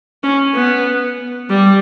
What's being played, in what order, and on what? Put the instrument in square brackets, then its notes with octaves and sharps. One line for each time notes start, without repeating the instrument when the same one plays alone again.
[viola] C#4
B3
G3